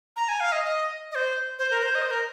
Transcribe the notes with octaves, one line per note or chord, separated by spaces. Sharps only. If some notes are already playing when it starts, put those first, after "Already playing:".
A#5
G#5
F5
D#5
D#5
D#5
C5
C5
A#4
C5
D#5
C5
A#4